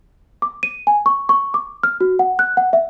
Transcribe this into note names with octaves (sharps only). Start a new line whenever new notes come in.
D6
D#7
G#5
C#6
C#6
D6
F6
F#4
F#5
F#6
F#5
E5